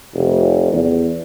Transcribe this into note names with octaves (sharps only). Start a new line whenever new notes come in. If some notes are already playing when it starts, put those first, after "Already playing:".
F1
E2